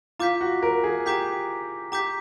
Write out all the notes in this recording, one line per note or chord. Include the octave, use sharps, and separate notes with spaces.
F4 A#5 D6 G6 B6
F#4
A#4
G#4
G4 A#5 D6 G6 B6
G4 A#5 D6 G6 B6